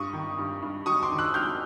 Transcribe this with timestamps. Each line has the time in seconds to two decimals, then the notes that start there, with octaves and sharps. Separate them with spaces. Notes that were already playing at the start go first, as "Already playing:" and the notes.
Already playing: G2 C#6 D#6
0.13 D#3
0.38 G2
0.62 G2
0.86 F#3 C#6 D#6
1.02 C6 D6
1.11 D#3
1.18 E6 F#6
1.34 F#3 F6 G6